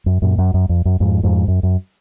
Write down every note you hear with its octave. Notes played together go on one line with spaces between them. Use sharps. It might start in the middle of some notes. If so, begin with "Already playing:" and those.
F#2
F#2 A#2
F#2
F#2
F2
F#2
F2 G#2
F2 G#2
F#2
F#2